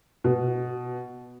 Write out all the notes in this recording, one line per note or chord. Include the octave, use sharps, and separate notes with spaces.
B2